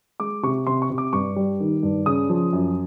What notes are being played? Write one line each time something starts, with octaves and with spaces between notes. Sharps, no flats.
G#3 D6
C3 C#6
C3 C6
C#6
C3
D6
G2 C#6
G3
D#3
G2
C#3 D#6
F3
F#2